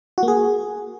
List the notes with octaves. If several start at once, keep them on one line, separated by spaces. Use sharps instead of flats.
F#4
A#3
G#4